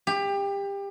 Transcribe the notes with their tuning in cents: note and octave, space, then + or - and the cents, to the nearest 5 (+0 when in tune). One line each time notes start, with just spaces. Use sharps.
G4 +25